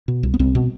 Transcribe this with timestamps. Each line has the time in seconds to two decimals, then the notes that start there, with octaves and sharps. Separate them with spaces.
0.08 B2
0.23 C2
0.34 B3
0.39 C2 C4
0.55 B2